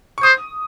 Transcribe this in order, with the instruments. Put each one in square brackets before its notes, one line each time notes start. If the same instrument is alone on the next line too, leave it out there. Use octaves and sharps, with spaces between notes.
[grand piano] C#6
[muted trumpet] C5 [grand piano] D#6